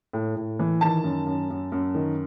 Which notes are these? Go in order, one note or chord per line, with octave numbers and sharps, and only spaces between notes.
A2
A2
E3
D#3 A5
F#2
F#2
F#2
F#2
D#3